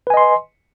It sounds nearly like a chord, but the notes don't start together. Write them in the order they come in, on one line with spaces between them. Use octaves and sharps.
B4 G#5 D#5 C6